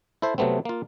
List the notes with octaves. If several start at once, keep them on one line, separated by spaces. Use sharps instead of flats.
E4 A4 C5 E5
C3 F#3 A3 B3 C4
A#3 F4